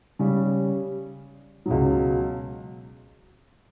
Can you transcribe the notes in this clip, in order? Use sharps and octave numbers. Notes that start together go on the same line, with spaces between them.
C#3 G3 C#4
C#2 B2 F#3